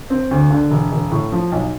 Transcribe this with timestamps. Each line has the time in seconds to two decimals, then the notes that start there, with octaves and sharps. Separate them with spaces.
0.10 C4
0.31 D2
0.50 D3
0.71 E1
0.91 E1
1.11 A2
1.32 F3
1.52 B1